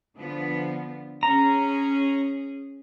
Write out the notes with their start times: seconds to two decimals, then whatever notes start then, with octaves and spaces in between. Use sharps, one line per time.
0.17 D3 F3 B3
1.23 C#4 G#4 A#5